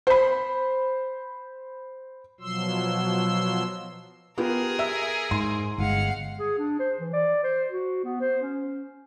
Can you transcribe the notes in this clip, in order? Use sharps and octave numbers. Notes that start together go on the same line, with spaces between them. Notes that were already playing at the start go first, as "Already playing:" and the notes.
C5 B5
B2 F3 F#3 C6 E6
B3 F4 G4 G#4 A#4
E5 E6
G#2 C6
G1 A#2 G#3 F5 F#5
G#4
D4
C5
E3
D5
C5
F#4
B3
C5
C#4